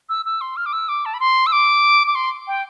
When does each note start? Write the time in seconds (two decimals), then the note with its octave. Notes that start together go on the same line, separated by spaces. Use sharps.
0.09 E6
0.26 E6
0.41 C6
0.57 F6
0.66 D6
0.73 E6
0.89 D6
1.06 A5
1.14 B5
1.20 C6
1.47 E6
1.52 D6
2.07 D6
2.15 C6
2.47 G5